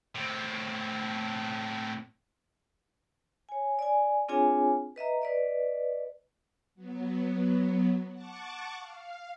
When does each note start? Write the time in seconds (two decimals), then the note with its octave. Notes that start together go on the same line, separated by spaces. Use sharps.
0.15 A2 C4
3.49 C#5 G#5
3.79 D5 G#5
4.28 C4 D4 F4 G#4 C#5 G#5
4.96 B4 D#5 E5 A#5
5.22 B4 D5 D#5
6.75 F#3 B3
8.12 F#5 A5 C#6 D6
8.77 F5